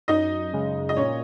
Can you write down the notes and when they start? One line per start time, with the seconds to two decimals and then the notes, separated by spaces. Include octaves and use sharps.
0.08 F#2 D#4 D#5
0.53 C#3 G#3
0.89 D#5
0.97 A#2 C#4 C#5